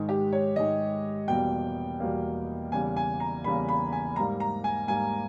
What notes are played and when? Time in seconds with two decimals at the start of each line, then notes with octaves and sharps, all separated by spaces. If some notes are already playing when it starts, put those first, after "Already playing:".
Already playing: G#2 D#3 G#3
0.09 G4
0.33 C#5
0.56 G#2 D#3 G#3 D#5
1.28 E2 B2 G3 A#3 G5
2.00 E2 B2 G3 A#3
2.72 E2 C#3 G3 A#3 G#5
2.96 G#5
3.20 A#5
3.44 E2 C#3 G3 A#3 B5
3.69 B5
3.92 G#5
4.16 G#2 G3 A#3 A#5
4.40 A#5
4.64 G#5
4.88 G#2 G3 A#3 G#5